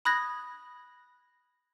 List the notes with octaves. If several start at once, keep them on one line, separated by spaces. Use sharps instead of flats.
B5 D#6 F#6 G#6 A#6